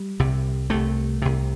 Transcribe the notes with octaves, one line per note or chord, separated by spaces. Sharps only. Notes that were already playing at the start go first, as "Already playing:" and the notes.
Already playing: G3
C2 C3
C2 C3 A3
C2 C3